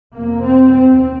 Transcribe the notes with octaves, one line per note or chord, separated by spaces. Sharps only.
F2 C3 A#3
C4
D#2 C4